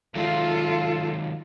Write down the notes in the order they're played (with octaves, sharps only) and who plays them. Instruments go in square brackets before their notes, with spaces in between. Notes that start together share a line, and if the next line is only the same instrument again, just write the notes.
[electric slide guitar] D#3 F#3 G#3 [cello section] F4 [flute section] A4 E5 F5